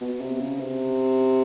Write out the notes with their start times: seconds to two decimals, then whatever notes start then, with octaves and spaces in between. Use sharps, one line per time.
0.01 B2
0.21 C3
0.40 C#3
0.60 C3